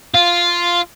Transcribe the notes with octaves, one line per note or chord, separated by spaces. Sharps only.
F4